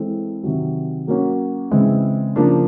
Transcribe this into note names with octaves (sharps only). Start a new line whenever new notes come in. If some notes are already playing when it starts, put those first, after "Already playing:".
Already playing: E3 G#3 C4 E4 A4
C3 D#3 F#3
F#3 A#3 C#4 F#4
C#3 E3 G#3 C4 E4
C#3 F3 A#3 D4